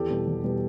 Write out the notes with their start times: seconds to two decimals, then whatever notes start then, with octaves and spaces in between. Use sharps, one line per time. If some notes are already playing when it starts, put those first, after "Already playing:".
Already playing: E2 G4 A4
0.10 B2 G3
0.27 E2
0.44 B2 G3